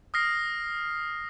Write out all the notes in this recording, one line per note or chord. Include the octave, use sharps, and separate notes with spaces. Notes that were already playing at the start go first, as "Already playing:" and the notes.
D#6 F6 A#6 C7